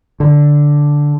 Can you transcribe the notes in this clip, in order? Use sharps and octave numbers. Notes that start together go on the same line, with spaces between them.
D3